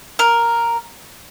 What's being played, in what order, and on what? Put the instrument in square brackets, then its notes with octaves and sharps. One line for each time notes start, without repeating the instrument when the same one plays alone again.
[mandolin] A#4